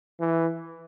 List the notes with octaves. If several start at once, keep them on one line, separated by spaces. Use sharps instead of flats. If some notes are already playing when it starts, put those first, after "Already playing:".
E3